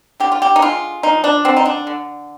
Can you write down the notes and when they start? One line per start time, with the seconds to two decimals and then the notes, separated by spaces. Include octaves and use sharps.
0.20 D3 G4
0.32 F4
0.42 G4
0.56 D#4
0.62 G#3 F4
1.03 F3 D#4
1.24 D4
1.45 D3 C4
1.57 D#4
1.65 D4
1.87 D3